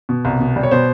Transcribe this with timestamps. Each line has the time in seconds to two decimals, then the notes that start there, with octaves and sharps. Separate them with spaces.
0.09 B2
0.25 C2
0.40 B2
0.56 G3
0.63 C#5
0.71 B2 C5